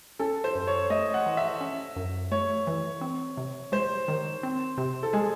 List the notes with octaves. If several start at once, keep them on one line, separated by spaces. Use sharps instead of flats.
C#4 A4
C5
F#2
C#5
A3 D#5
F#5
E3
E5
C#4
F#2
A3 C#5
E3
C4
C3
G#3 C5
D#3
C4
C3
A4
G#3 G#4